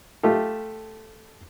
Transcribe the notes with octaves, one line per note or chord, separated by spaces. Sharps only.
A3 F4 G4 A4